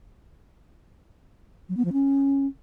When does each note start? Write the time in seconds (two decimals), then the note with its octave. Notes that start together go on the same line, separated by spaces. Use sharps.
1.69 F#3
1.77 B3
1.85 F3
1.93 C#4